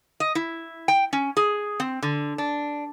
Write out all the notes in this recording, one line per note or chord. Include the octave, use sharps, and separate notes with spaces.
D#5
E4
G5
C#4
G#4
C4
D3
D4